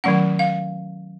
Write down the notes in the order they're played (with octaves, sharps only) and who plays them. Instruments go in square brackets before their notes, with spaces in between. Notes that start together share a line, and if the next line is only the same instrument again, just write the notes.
[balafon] D#3 F#3 A3 C#4 F#5
F5